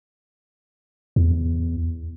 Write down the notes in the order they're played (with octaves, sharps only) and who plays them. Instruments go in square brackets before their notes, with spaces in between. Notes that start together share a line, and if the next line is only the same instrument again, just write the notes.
[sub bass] E2